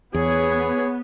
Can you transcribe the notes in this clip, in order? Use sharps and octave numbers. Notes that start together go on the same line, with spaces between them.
E2 B3 G#4 C#5